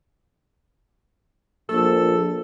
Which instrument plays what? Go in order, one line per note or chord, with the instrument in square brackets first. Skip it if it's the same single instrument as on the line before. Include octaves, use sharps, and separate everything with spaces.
[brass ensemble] A#1 [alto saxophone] A4